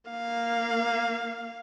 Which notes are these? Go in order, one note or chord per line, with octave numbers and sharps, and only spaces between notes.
A#3 F5